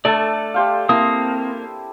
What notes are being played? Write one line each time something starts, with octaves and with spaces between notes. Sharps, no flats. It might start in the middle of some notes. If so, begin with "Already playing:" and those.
A3 D4 A4 D5
G4 C5 F5
A#3 C4 E4 C5 A5 D#6